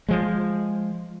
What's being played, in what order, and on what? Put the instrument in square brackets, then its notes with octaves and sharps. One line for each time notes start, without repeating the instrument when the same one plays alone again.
[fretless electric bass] F3 G#3